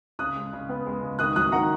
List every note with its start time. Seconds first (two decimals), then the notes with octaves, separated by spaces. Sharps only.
0.19 C#3 D#6 F#6
0.36 G#3
0.53 C#3
0.69 B3
0.86 G#3
1.03 C#3
1.19 D#3 D#6 F#6
1.36 F#3 D#6 F#6
1.52 D#3 F#5 A#5